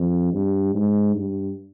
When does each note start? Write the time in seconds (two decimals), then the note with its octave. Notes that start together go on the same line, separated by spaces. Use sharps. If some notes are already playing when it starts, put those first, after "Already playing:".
Already playing: F2
0.33 G2
0.74 G#2
1.15 G2